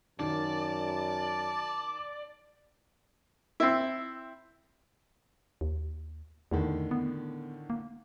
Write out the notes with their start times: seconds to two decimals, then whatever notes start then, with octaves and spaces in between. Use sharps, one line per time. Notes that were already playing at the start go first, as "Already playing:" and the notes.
0.20 F#2 D#3 D5 A5
3.60 C4 E4
5.61 D#2
6.51 E2 A2 D3 D#3
6.91 B3
7.70 A#3